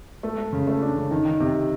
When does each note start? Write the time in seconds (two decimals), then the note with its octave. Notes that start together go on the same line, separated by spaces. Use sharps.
0.23 A3
0.38 A3
0.53 C#3
0.67 A3
0.82 D4
0.96 C#3
1.11 D#3
1.25 D#3
1.40 C3